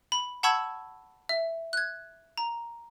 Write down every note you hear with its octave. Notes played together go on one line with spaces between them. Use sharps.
B5
F#5 A5 B5 C#6 E6 G#6
E5
F#6 G#6
A#5